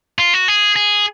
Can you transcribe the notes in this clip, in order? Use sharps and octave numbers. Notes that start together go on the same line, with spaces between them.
F4
F#4
G#4
G#4